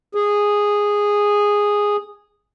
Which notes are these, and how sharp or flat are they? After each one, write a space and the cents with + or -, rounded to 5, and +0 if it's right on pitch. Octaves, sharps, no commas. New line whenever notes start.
G#4 -10